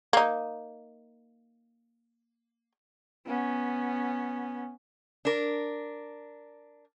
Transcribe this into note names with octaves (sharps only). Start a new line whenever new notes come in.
A#3 D#4
B3 C#4
D4 A#4